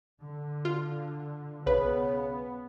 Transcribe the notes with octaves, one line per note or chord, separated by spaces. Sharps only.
D3
F4
B1 C#3 B3 B4